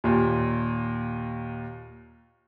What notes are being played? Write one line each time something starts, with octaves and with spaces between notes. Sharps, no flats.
D#2 A#2